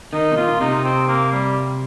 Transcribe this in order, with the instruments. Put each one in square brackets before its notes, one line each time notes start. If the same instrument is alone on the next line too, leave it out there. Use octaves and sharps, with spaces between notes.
[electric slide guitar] D#3 [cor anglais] D#4
[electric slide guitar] C3
[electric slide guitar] A#2 [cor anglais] F4
[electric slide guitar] C3 [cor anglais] D#4
[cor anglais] C4
A#3
G3